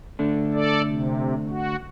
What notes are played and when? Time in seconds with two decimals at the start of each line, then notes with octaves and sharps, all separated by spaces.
0.19 D3 A3 D4
0.53 A4 D5
0.88 C3
1.50 F#4